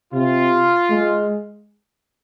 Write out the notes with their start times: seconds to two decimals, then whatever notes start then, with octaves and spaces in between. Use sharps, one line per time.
0.13 C3 F4
0.90 G#3